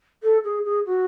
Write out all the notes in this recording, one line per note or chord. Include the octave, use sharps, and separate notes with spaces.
A4
G#4
G#4
F#4